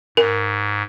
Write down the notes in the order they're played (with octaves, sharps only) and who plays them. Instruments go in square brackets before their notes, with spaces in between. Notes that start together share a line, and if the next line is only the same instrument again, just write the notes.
[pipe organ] G#2 [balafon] A#4